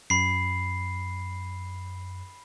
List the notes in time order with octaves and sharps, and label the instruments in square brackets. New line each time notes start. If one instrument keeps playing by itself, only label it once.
[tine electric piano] F#2 [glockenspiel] B5 C7